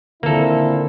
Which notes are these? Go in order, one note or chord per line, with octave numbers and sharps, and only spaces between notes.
A#2 D3 D#3 A#3 C4 E4 A4